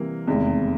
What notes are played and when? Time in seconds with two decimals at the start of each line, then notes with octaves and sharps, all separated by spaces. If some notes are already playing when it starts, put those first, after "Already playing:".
Already playing: C3 E3 G3 A#3
0.27 F1 E2 C3 D#3 G#3